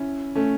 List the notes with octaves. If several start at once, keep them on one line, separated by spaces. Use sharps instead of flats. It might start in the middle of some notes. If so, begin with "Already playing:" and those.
Already playing: C#4 E4
A3 C#4